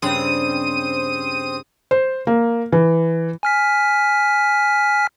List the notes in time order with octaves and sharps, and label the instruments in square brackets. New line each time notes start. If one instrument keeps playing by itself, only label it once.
[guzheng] G2 C#3 G3 [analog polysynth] C4 D#6 D#7
[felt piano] C5
A#3
E3
[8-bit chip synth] G#5 F6 B6